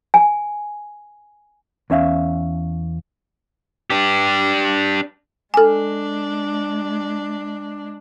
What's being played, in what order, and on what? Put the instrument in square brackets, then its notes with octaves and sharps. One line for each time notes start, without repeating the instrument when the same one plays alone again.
[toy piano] G#5
[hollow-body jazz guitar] E2 C#4 E5 F5
[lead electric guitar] D4 G4
[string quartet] G#3 D4 [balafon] A4 G#5